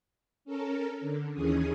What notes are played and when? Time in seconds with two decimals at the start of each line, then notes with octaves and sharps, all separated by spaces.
0.45 C#4 A4 A#4
1.01 D3
1.33 D#2 D#3 E3 C#4 G#4 D#6